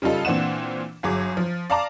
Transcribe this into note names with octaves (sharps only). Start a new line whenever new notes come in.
C#3 G3 D#4 F4 A4
A#2 E3 C4 D4 F#5 E7
G1 F#3 G#4 D6
F3
D5 F5 A5 A#5 D6